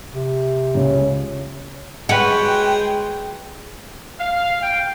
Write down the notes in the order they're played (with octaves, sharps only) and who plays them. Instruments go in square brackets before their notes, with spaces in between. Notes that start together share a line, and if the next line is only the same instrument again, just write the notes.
[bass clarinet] C3
[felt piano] C#2 [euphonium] C#4
[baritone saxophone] G#3 [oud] F#4 [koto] B4 C#5 [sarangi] G5
[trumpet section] F5
G5